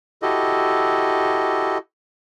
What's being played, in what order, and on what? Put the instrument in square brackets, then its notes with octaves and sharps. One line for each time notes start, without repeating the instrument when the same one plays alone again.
[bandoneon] E4 F#4 G4 A4 D#5